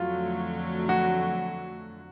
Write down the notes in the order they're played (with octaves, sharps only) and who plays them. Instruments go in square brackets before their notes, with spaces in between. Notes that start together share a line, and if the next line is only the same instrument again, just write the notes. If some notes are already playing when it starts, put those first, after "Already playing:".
Already playing: [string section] F2 D3 F#3 A3 [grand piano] F4
[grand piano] F#4